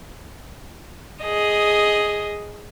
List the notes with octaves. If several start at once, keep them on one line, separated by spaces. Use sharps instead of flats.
G#4 D#5